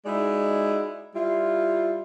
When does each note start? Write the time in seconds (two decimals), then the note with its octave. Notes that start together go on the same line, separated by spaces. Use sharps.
0.06 G#3 D#4 E4 F#4 D5
1.15 G3 E4 F4